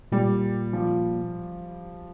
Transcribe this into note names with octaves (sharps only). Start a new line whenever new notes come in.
A#2 G3
F3